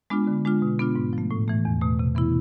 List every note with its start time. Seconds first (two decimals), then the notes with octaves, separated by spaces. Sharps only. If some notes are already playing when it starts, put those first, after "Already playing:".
0.10 G#3 B3 D4 F4
0.27 D3
0.45 G#3 D4 F4
0.62 B2
0.79 B3 D4 F4
0.95 G#2
1.13 F3 A3
1.31 A2
1.48 E3 A3
1.65 E2
1.81 B2 A3
1.99 C3
2.15 E3 B3 E4